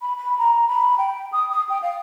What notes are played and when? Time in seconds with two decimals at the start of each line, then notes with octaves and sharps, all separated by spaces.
0.01 B5
0.17 B5
0.38 A#5
0.68 B5
0.98 G5
1.32 D#6
1.51 D#6
1.69 G5
1.82 F5